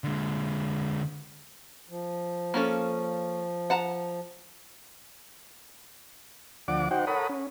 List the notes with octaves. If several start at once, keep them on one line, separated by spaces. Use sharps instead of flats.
D3 G#3
F3
A#3 C#4 A4
F#5 A5 A#5
D2 F3 D5 F#5 D6
D#4 F#4 C5 F#5 G5
A4 A#4 C#5 F#5 B5 D#6
C#4